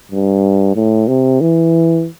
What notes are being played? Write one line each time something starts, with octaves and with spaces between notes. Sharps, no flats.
G2
A2
C3
E3